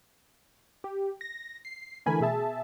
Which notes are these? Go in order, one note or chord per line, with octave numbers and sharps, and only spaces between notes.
G4
A#6
C7
D3 E3 A3 A#4 G#5 B5
B2 G#4 E5 A5